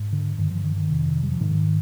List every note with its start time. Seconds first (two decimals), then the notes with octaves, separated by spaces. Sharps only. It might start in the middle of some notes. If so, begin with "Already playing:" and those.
Already playing: G#2
0.12 D3
0.38 G2 D3 D#3
0.51 F3
0.64 D#3
0.76 D#3
0.90 F2 C3
1.23 G3
1.32 F3
1.40 G#2 D#3